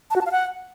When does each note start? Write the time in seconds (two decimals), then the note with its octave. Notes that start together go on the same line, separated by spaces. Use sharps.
0.11 A5
0.16 F#4
0.21 A5
0.26 F5
0.31 F#5